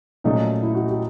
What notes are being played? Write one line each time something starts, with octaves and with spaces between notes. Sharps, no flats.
A#2 F#3 A3 C#4 D#4
E4
F#4
G4